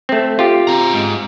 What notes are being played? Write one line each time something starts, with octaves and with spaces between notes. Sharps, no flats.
A3 C4
F4 G4
C4 A#5
G#2